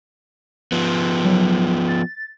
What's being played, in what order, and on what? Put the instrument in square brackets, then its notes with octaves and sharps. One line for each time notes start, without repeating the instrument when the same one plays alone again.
[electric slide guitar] F3 B3
[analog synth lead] F#3
A6